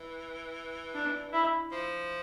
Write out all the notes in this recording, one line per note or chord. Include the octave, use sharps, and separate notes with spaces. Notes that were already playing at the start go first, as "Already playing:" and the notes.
Already playing: E3
D4
E4
F3